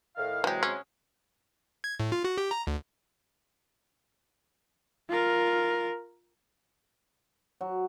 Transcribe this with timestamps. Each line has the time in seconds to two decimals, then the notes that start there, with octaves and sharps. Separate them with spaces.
0.16 A2 D#3 F5
0.44 C3 E3 F#3 G#3 G4
0.63 C#4
1.84 G#6
2.00 A2
2.12 F4
2.24 F#4
2.38 G4
2.51 A#5
2.67 D2
5.10 F4 A#4
7.61 F#3